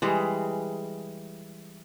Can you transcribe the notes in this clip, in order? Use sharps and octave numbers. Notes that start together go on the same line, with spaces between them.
E3 G3 G#3 G#4